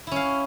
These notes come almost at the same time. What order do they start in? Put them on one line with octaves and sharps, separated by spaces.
E4 C#4 F5